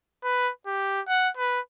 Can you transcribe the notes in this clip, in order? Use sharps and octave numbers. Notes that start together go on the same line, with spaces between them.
B4
G4
F#5
B4